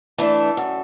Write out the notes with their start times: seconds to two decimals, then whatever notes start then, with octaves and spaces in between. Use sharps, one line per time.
0.18 E3 A3 D4 A4
0.57 F#2